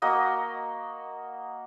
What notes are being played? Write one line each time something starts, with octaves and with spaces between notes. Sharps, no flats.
A#3 F#4 D#5 D#6